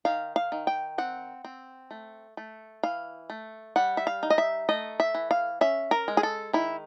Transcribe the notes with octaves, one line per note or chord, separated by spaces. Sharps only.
D#3 F5
F5
D#3
G5
C4 F#5
C4
A3
A3
E3 F5
A3
G3 F#5
E5
F5
D#4
D#5
E5
A3 D#5
E5
E3
F5
C#4 E5
A#4
G#3
G#4
A4
D#3 E4